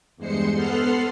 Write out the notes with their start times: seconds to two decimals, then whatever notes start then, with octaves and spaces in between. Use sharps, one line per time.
0.17 E2 G2 G#3 C5 C6 C#7
0.54 B3 A4 F#5 C6 F6 C7